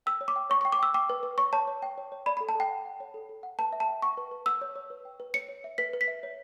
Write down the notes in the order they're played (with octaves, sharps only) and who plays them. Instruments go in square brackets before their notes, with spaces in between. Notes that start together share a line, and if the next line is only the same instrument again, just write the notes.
[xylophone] G5 E6
C#5
D6
G5
C#5 C#6
C#6
G5
D6
G5 E6
G5 D6
B4
B4
C#5 C#6
C#5 A5
C#5
G5
C#5
C#5
D5 B5
B5
A4
A5
A4 G5
F#5
F#5
C#5
A4
A4
F#5
B4 A5
E5
A5
G5
F#5 C#6
B4
B4
F#5 E6
C#5
C#5
B4
G5
B4
C#5 C#7
C#5
E5
B4 B6
B4
B6
E5
C#5